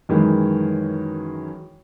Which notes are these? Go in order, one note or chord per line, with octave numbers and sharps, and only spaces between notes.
F#2 D#3 E3 G#3